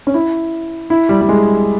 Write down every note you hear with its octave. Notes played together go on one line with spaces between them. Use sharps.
C#4
E4
E4
G3
G3
G#3